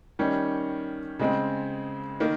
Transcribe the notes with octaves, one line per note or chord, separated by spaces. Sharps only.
D#3 G3 C#4
C#3 G#3 C4
D#3 A#3